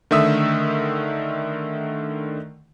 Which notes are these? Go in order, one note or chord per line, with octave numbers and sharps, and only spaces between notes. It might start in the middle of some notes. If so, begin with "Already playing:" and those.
D3 D#3 A3 E5 D#6 E6